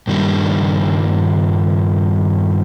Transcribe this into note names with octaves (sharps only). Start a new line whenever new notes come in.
G2 D#3 G3 A#3